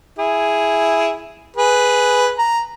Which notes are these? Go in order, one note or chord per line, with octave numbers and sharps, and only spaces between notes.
E4 G#4
G#4 B4
A#5